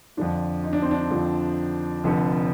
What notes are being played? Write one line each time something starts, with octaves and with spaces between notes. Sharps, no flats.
F2 D3 F3 D4
D#4
D4
C4
D4
F2 D3 F3
F1 F2 D3